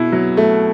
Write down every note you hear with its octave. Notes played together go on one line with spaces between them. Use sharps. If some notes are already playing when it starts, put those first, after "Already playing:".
Already playing: B2 B3 E4
F#3
A3